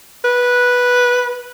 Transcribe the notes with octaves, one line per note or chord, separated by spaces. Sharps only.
B4